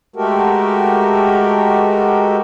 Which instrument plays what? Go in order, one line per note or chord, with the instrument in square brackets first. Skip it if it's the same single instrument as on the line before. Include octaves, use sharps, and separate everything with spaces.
[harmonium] G#3 A3 F#4 G4 A4 A#4